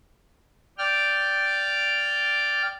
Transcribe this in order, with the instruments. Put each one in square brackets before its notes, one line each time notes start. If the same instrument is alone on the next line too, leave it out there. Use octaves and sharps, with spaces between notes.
[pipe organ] D5 G5 F6